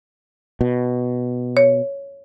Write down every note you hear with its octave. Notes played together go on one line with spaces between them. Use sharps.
B2
C#5